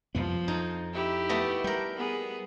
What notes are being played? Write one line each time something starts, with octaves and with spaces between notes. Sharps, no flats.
C2 F2 F3 B3
F2 D#4
E4 G4
A3 B3 D#5
G3 A#4 G5
B3 G#4